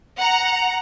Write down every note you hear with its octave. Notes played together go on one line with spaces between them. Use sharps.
F#5 A#5